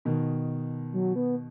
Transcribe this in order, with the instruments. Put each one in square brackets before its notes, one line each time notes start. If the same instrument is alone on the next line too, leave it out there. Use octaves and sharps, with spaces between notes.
[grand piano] B2 D#3
[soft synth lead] F#3
B3